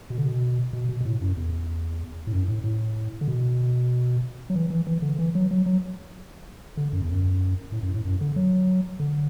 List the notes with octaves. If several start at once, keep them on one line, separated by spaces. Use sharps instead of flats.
B2
D3
B2
B2
B2
B2
A2
F#2
E2
A2
F#2
A2
A2
D3
B2
F#3
E3
E3
E3
D3
E3
F#3
F#3
F#3
D3
F#2
E2
F#2
A2
F#2
A2
F#2
D3
F#3
D3